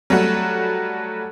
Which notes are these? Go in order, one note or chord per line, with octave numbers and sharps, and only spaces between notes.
F#3 G3 A3 F#4